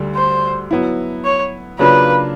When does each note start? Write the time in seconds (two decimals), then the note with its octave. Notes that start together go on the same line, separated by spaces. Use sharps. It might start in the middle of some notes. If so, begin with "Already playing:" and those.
Already playing: D2 D3 G3
0.15 C5
0.71 F#3 B3 E4
1.24 C#5
1.79 C#3 F#3 A#3 D4 F4 B4